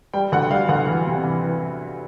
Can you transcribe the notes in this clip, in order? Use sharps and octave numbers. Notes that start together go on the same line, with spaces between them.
G3 G5
D2 F#5
G3 F5
D2 F#5
E3
C3
E3
E3